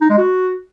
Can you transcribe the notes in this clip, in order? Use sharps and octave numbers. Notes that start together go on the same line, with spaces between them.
D#4
G#3
F#4